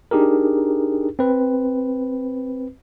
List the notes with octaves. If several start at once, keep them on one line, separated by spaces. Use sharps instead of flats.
D4 D#4 G4 G#4 A#4
C4 B4